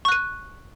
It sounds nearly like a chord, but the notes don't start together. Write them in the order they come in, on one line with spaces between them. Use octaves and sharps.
C#6 F#6 D#7